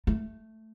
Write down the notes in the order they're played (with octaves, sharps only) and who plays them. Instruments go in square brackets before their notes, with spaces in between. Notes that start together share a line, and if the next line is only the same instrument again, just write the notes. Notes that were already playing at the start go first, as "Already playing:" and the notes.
[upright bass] A3